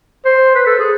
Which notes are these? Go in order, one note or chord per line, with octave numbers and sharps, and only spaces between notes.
C5
B4
A4
G#4